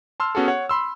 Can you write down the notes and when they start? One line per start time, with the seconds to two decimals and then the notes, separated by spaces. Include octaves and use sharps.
0.20 A5 C6 E6 F6
0.35 B3 C#4 F#4 G#4 A4
0.48 C#5 F#5
0.69 B5 C6 E6